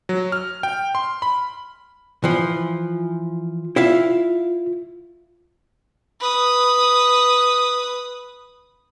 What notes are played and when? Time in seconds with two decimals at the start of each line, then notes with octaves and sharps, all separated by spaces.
0.09 F#3
0.32 F6
0.63 G5
0.95 C6
1.22 B5
2.24 E3 F3
3.76 E4 F4 E5 F5
6.20 B4 D#6